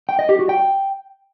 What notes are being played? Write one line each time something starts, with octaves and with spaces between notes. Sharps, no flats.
G5
D#5
G4
F#4
G5